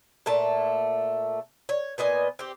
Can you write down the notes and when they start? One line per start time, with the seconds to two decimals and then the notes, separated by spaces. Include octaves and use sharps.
0.26 A#2 A3 A5
1.69 C#5
1.98 A#2 B3 D#5 G#5
2.39 C4 G4